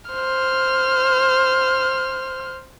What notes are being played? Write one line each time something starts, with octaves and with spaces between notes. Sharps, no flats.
C5 F6